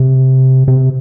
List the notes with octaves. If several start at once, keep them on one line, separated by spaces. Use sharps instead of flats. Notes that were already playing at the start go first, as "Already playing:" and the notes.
Already playing: C3
C3